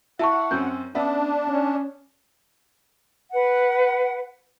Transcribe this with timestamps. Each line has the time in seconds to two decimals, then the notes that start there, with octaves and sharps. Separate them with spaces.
0.19 E4 E5 F#5 A5 C#6
0.51 F#2 C4 C#4 G6
0.95 B3 C#4 D4 D5 E5
1.48 C#4
3.32 B4 F#5